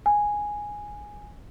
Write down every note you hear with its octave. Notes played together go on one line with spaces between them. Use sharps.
G#5